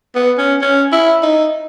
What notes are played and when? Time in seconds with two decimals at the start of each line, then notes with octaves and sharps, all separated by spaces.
0.15 B3
0.38 C#4
0.61 C#4
0.92 E4
1.23 D#4